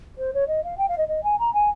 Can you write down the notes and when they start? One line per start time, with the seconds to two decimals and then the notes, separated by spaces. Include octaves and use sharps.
0.18 C5
0.34 C#5
0.48 D#5
0.64 F5
0.78 G5
0.88 F5
0.98 D#5
1.08 D#5
1.24 G#5
1.39 A#5
1.53 G#5